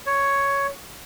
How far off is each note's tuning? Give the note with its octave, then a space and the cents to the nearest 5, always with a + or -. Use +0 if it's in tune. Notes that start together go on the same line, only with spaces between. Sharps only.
C#5 +5